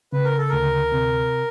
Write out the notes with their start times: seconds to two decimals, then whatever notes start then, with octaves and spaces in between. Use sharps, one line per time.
0.13 C#3 B4
0.24 A#4
0.38 A4
0.49 D2 A#4
0.92 C3